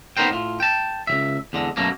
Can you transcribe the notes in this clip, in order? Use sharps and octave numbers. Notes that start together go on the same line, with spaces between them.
B3 D#4 A#4 C5 G5
A2 F4
G5 A5
C#2 F3 E5
E2 D3 G#3
F#2 B2 F#3 A3 A#3